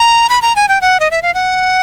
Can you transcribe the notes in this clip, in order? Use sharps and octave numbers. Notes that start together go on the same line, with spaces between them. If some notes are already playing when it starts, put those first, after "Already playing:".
Already playing: A#5
B5
A#5
G#5
G5
F#5
D#5
E5
F5
F#5